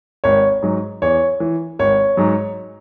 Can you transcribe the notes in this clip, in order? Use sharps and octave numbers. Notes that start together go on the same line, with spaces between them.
G#1 C#5
G#2 F#3
E2 C#5
E3
G#1 C#5
G#2 F#3